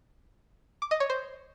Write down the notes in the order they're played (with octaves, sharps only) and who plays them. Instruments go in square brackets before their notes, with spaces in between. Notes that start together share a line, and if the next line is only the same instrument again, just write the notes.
[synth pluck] D6
D#5
C#5
C5